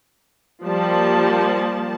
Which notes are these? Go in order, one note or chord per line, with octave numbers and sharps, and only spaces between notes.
F3 G3 A#3 A5